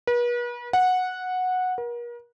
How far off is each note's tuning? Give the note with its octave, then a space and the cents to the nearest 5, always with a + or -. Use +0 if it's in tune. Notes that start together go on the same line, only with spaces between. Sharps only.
B4 -40
F#5 -10
A#4 +40